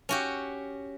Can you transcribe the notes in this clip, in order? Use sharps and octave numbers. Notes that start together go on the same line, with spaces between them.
C#4 F#4 G4